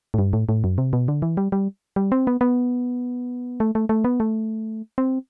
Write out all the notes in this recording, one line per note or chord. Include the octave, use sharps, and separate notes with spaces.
A2
G2
A2
A2
F#2
C3
B2
D3
E3
G3
G3
G3
C4
B3
B3
A3
A3
A3
B3
A3
C4